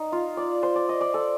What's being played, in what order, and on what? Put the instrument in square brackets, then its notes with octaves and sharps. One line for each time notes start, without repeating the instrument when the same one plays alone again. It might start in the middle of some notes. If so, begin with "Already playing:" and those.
Already playing: [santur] D#4
F4
D5
C5
D5
D#5
D5
A4